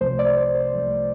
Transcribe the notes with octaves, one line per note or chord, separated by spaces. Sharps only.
C2 C3 F3 A3 C5
D5
C5
C5
C2 C3 F3 A3